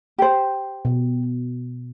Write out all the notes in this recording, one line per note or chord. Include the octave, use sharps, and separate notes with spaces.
G4 C5
B2